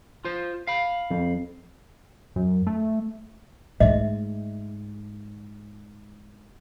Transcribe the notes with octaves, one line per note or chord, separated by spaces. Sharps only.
F4 C5
F5 B5
F2
F#2
A3
G#2 A3 D#5 E5